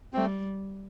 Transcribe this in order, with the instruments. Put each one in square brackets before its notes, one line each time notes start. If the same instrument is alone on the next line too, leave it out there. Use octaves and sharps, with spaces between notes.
[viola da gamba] G3 [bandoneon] A3 C4